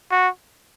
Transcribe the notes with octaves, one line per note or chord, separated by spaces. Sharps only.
F#4